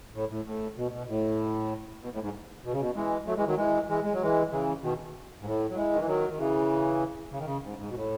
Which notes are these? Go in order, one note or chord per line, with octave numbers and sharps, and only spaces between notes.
A2
A2
A2
B2
B2
A2
B2
A2
G#2
B2
C#3
B2
E3 G#3
F#3 A3
E3 G#3
D#3 F#3
E3 G#3
E3 G#3
G#3
F#3
E3 G#3
C#3 E3
B2 D#3
G#2
A2
F#3
E3 G#3
D#3
E3
D#3 F#3
D#3
C#3 E3
C#3
D#3
C#3
G#2
G#2
B2
A2